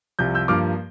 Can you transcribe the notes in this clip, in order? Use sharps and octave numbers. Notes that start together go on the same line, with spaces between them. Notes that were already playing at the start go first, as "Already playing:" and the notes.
C2 C3 F3 G6
E6 G6
G2 F3 A#3 D6 F6